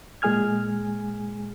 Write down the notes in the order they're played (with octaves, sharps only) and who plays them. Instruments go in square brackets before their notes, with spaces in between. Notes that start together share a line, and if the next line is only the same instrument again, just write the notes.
[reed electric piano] A#2 G#3 G#4 G#5 F6 G#6